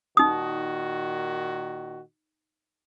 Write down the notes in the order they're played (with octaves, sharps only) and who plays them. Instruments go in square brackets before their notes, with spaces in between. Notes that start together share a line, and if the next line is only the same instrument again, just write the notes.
[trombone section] A#2 D#3 F#4 [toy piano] D#4 D#6